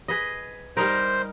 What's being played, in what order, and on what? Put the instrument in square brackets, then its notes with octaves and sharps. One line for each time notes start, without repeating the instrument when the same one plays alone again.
[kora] G#4 B4 D#5
[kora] G3 D#4 A#4 [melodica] C5